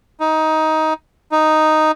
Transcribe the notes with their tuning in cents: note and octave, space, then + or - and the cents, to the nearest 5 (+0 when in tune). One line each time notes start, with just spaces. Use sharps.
D#4 +15
D#4 +0